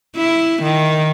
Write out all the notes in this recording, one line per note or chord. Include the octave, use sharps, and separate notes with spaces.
E4
D#3